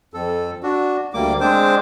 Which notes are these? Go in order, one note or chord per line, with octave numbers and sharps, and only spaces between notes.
F2 A4
D4 F#4
D2 G3 A#3 D6
G#3 C4 D4 C5 D6